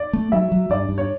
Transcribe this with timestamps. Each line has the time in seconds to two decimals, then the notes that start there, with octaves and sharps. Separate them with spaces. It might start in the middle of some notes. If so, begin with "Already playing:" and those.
Already playing: D5
0.13 A3
0.32 F#3 E5
0.52 F#3
0.70 G2 D5
0.89 G2
0.98 C#5